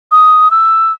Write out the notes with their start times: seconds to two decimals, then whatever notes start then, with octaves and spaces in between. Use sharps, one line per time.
0.12 D#6
0.51 E6